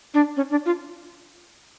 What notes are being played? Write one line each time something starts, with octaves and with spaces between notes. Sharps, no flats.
D4
C#4
D4
F4